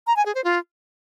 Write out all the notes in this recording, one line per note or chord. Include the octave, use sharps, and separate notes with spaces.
A#5
G#5
G#4
C5
F4